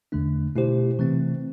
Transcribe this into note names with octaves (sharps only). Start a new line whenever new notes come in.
E2 D3 A3 D4
B2 A3 E4 G4 C5
C3 E3 A3 C4